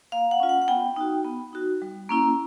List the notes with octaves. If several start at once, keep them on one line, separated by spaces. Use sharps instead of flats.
A#3 F5
F#5
C#4 F4
F#5
F#5
B3 G5
D#4 F#4
B3
D#4 F#4
G3
A#3 C#4 E4